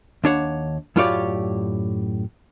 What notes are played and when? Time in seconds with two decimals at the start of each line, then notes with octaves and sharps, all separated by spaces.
0.24 D#2 D4 C#5 F#5
0.96 F#2 A2 F4 G4 C#5 D5